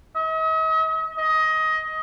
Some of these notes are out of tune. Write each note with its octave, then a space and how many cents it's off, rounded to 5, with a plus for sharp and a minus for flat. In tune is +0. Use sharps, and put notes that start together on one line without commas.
D#5 +45
D#5 +15